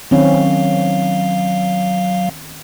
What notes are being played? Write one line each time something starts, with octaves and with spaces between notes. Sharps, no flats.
D#3 F#3 C4 C#4 F5